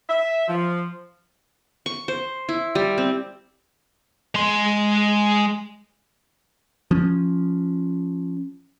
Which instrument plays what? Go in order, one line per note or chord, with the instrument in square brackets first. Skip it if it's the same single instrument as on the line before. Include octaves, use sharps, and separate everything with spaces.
[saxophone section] E5
F3
[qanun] C#6
C5
E4
G3
C4
[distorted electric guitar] G#3 C6
[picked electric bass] F3 C#4